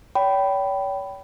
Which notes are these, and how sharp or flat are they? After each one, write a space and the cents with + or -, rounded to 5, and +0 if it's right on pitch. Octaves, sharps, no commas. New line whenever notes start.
C#5 +40 G5 -15 B5 +5